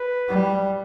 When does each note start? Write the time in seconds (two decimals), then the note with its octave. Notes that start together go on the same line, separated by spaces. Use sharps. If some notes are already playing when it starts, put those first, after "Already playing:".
Already playing: B4
0.28 G3